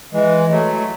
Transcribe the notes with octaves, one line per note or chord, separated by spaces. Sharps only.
E3 G#3
F#3 A3